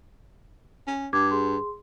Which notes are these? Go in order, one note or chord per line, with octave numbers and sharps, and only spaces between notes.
C#4
G2 D6 G#6
G#4 C6